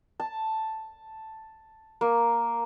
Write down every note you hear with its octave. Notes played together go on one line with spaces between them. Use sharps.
A5
A#3